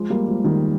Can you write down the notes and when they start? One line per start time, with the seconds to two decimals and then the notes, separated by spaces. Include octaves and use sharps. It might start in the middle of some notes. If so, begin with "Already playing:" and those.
Already playing: F3 G#3
0.10 G3 A#3
0.28 F3 G#3
0.44 D#3 G3